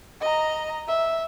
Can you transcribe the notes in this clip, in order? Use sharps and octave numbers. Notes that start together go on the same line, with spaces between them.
D#5 A#5
E5